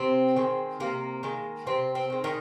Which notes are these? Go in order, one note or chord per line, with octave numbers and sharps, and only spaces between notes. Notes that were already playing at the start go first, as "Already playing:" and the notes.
Already playing: C3 C4
D#3 G#3
C3 A#3
D#3 G#3
C3 C4
C4
D#3 G#3
D#3 D#4